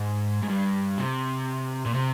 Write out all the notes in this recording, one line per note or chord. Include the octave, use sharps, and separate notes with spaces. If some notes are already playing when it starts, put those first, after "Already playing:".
Already playing: G#2
G#2
G2
C3
A#2
C3